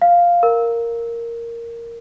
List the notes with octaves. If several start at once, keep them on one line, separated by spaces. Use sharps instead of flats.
F5
A#4